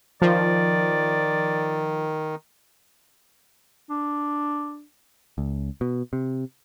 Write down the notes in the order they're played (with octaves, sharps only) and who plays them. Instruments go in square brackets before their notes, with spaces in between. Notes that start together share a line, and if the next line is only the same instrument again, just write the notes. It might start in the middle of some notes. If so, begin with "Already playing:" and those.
[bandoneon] D#3 [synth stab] F3 [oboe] D5
[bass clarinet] D4
[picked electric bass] C#2
B2
C3